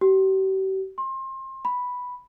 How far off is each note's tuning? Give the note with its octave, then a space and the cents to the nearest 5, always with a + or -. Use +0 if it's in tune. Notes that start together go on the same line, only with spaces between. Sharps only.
G4 -40
C6 +30
B5 +0